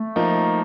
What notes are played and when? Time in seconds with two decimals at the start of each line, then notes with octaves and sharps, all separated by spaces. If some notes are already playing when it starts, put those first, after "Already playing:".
Already playing: A3
0.16 F3 A#3 D#4